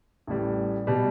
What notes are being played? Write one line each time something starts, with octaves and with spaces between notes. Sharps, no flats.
A1 A2 G3
B2 G3